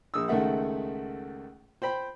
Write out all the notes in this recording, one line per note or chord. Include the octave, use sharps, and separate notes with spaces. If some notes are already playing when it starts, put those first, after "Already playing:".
A#1 D#6 E6
C#2 D#3 A3 E5 F#5
C5 G5 B5